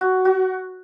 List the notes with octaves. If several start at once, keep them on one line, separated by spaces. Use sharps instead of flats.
F#4
F#4